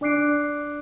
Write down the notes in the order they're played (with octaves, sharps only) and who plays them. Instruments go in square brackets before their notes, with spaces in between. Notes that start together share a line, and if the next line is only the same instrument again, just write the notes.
[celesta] D4 D5 D6 F#6 C7 D7